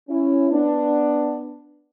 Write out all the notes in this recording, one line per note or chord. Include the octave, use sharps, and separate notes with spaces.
C#4 E4
B3 D4